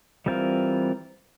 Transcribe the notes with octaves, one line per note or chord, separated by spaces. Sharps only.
E3 G3 C4 F4 A#4